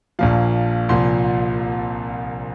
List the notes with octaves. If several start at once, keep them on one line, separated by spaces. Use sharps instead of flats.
A#1 A#2 F3 F5
C2 A#2 F3 C6